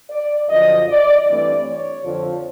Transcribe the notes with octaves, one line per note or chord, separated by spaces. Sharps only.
D5
F#2 D3 F3 D#5
D5
G2 E3 A3 C4 D5
C#5
F2 D3 F3